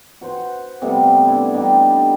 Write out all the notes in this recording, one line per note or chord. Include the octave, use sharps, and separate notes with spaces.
F#4 B4 C5
C3 G3 A3 B3
D4 E4
G3 D4 D#4 G4